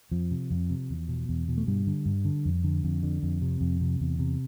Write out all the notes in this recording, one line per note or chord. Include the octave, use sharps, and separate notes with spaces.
F2 F3
C3
F2
C3
E2
B2
E2
B2
A3
G2 G3
D3
G2
D3
F2
D3
F2
D3
F2
C3
F2
C3
E2
C3